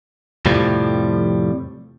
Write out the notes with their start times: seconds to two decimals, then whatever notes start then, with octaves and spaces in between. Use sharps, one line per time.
0.46 F2 A2 C3 F3 G3